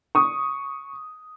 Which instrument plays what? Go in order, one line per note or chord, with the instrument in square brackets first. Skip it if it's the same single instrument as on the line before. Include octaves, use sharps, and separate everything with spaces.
[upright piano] C#6 D#6